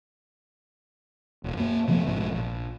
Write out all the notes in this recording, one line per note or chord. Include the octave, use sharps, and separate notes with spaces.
D#1
F#2 A#3
C3 F3 A3 B3
A#1 G#2 F3
A#1